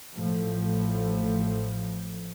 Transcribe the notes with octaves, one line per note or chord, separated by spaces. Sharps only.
A1 A2 F3